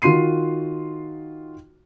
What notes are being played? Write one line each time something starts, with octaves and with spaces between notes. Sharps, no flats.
D#3 F4 F#4 C6 C7 D#7